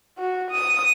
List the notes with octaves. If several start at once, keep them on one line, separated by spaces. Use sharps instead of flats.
F#4
D#6